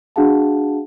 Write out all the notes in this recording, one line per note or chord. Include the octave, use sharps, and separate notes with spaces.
D4 F#4 G#4 F5 F#5 A5